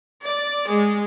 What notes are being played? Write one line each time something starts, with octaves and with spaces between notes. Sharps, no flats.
D5
G#3